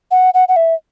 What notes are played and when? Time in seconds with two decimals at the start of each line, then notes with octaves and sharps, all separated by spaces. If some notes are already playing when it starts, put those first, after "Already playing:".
0.11 F#5
0.34 F#5
0.48 F#5
0.56 E5